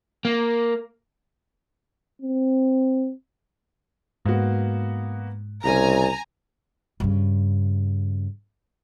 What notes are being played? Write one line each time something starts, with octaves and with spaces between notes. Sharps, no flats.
A#3
C4
G#2 A#3 B3 F#4
C2 C#3 G3 C#4 G#5 A#5
G2 C#3